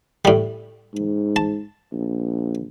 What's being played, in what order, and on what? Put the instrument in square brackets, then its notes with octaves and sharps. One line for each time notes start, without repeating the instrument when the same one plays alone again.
[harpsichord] A2 G3
[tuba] G#2
[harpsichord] A5
[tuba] A#1